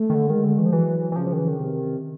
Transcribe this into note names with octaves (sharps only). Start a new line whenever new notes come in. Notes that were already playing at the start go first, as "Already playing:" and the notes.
Already playing: A3
D#3
D3
D#3 G#3
D3
E3
F3
E3 F#3
E3
C#3 F3
F3
D#3
E3
D#3
C3